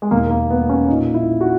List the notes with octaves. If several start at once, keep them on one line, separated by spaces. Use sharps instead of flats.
G#3
E1 D#2 D#3 A#3
A#3
B3
C#4
A#1 A#2 D#4
E4
F#4